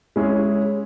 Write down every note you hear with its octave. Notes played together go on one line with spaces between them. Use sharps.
G#3 C#4 E4 G#4